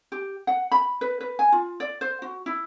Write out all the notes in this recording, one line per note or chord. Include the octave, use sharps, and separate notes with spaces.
G4
F#5
B5
B4
B4
G#5
F4
D5
C5
F#4
E4